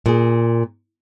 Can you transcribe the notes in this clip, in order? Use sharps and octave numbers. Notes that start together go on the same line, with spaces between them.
A#2 G#4